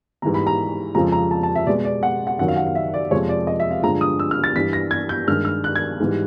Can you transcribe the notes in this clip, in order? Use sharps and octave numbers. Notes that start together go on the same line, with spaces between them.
G#2 E3 G3 A#5
B5
A#5
F2 C#3 F3 G#3 A#5
A#5
A5
A5
E5
B2 G#3 D5
D5
F#5
F#5
F#2 D#3 F#3 F#5
F5
F#5
F5
E5
D5
F2 C3 F3 G#3 C#5
D5
D#5
E5
F5
G2 D3 F3 G#3 A#5
D#6
E6
F6
A6
G2 E3 G3 B6
A#6
G#6
G6
G2 D#3 G#3 F6
F6
F#6
G#6
G#2 E3 G3